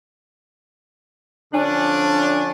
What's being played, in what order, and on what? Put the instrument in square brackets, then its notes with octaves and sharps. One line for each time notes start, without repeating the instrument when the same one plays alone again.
[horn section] D3 F3 C#4 D4